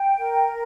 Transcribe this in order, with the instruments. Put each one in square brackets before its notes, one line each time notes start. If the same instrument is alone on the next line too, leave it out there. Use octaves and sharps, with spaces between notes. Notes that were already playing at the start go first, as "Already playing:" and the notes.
Already playing: [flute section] G5
A#4